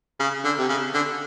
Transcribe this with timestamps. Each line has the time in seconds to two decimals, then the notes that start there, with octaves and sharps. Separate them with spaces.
0.20 C#3
0.44 D3
0.58 C3
0.69 C#3
0.94 D3